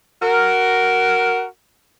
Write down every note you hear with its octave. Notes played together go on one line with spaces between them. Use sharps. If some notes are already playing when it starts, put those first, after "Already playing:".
F#4 A#4